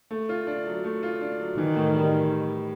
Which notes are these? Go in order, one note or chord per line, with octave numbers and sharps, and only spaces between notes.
A3
F4
D4
F#3
A3
F4
D4
F#3
D#3 E3
A2
G3